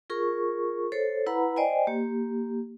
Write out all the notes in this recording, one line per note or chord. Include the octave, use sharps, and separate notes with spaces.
F4 G#4 A#4 C#6
A4 C5 C#5
E4 B4 F#5 A#5 B5
C5 D5 D#5 G5 G#5
A#3 G4